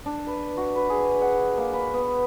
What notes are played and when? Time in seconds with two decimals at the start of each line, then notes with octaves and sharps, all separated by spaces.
0.06 D4
0.27 B4
0.57 F#4
0.76 B4
0.89 G#4
1.22 F#5
1.57 A#3
1.73 B4
1.94 B3